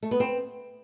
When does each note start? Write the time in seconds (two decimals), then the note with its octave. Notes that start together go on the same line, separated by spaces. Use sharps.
0.03 A3
0.11 B3
0.20 C4